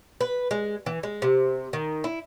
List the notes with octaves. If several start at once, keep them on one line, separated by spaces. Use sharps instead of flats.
B4
G#3
E3
G#3
C3
D#3
E4